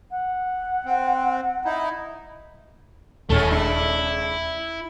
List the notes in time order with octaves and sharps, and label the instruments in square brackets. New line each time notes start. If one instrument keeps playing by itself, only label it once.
[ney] F#5
[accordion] C4
D#4 E4
[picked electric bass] D#1 [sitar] G#3 C#4 A4 [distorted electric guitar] A3 E4
[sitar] C3 G#3 D4 [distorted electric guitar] E4